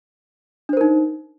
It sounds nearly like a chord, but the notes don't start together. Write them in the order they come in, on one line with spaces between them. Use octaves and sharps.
D4 C5 A#4 D#4